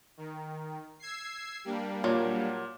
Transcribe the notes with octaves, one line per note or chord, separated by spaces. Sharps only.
D#3
E6 G#6 C7
G3 A#3 D4
A#2 F#3